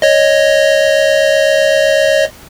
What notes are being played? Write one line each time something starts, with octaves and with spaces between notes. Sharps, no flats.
C#5 D#5